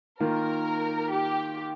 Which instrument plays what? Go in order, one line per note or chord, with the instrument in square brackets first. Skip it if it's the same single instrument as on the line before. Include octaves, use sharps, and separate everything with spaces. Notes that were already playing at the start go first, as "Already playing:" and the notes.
[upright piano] D#3 A#3 F4 [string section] A#4
[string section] G4